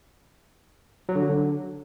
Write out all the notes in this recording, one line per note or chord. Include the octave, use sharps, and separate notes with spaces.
F#3
D3
F#3
D3